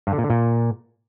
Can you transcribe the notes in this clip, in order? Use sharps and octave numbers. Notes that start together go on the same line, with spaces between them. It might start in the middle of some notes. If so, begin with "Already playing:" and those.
G2
D3
A#2
D3
A#2